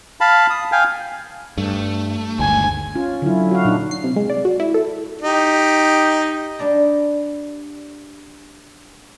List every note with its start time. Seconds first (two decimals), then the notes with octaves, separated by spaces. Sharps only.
0.21 F5 A5 B5
0.50 D#6
0.72 F5 G5 G#5
1.57 G2 A3
2.39 G1 D2 D#3 G#3 G#5
2.95 C#4 F4
3.22 D3 F#3 E4
3.51 F#4 F5
3.65 A#2 D4 D#4
3.91 C7
4.04 C3
4.16 G#3
4.30 D5
4.45 F#4
4.60 E4
4.74 A4
5.21 D#4 G4
6.59 G3 D4 D5 A#5